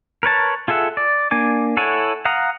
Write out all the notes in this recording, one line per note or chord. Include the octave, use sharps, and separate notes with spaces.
A#4 B4 C#5 A5
F4 G#4 A4 E5 F#5
D5
A#3 D4 G#5 D6
E4 A4 C#5 F#5 G#5
F5 F#5 A#5 D#6